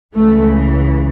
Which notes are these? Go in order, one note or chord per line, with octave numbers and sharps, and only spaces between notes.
C#2 C#3 E3 A3